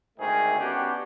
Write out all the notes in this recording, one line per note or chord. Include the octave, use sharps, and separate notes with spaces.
G#1 D2 G#2 D#3 A3 G#4
G3 B3 C#4 D4 F#4 G4